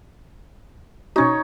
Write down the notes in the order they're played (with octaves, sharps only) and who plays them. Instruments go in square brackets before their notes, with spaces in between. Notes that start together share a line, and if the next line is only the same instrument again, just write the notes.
[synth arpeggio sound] B2 C#4 F#4 [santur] D#4 C#5